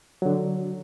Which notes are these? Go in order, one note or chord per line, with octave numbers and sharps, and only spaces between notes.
D3 F#3